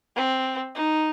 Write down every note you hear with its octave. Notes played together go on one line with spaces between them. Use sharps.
C4
D#4